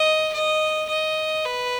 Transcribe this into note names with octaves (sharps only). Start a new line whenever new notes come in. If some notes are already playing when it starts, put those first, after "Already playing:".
Already playing: D#5
D#5
D#5
B4